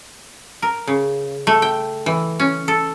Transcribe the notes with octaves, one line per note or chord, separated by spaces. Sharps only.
A#4
C#3
A3
G5
E3
C#4
A4